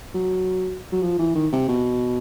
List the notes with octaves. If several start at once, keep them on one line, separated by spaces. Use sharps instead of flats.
F#3
F#3
F3
E3
D#3
C3
B2